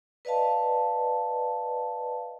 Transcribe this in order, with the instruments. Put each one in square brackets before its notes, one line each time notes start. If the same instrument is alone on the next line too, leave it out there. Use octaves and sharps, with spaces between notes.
[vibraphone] B4 D5 D#5 F5 A5